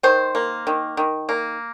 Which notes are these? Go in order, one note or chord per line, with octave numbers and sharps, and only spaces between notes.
D#3 C5
A#3
D#3
D#3
A#3